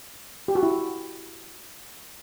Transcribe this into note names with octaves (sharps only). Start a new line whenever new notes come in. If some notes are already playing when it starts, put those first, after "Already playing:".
G4
F#4
E4